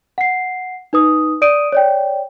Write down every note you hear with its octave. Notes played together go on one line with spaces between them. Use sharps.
F#5 C7
D#4 B4 D#6
D5 D#6 D7 D#7
C#5 D5 G5